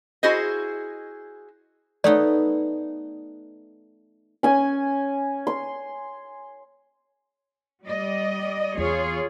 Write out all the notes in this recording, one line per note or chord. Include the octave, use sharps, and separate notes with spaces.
E4 F#4 G#4 C5 D#5
A3 B3 D#4 D5
C#4 G#5
C6
G3 D5 D#5
E2 F4 G#4 C#5